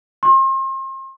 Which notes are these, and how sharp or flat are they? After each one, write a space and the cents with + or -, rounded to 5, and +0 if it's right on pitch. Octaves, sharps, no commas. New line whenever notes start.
C6 +40